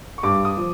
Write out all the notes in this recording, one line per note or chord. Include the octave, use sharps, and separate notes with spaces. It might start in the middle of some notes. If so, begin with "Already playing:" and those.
C#6
G2 D6
D#6
F3